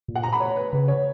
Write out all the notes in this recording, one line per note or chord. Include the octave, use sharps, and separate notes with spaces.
A#2
F#5
A#5
B5
C#5
B4
C#3 B4
C#5